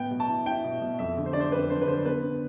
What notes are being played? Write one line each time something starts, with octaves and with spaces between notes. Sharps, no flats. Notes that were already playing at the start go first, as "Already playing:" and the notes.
Already playing: A2 B3 G5
B2
A5
E4
E4 G5
B2
B2
F2 E5
D3
C5
D4 D5
C5
F2 B4
D4 C5
B4
D3 C5
B3 B4
B3